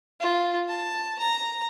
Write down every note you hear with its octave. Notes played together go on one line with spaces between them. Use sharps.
F4
A5
A#5